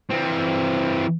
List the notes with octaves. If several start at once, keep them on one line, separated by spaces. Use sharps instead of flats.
E3 C4